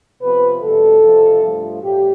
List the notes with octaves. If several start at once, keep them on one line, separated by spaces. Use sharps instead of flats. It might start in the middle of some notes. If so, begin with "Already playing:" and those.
C3 F3 B3 B4
E2 B2 G3 A4
F2 C3 F3
G2 F3 A3
A2 G3 G4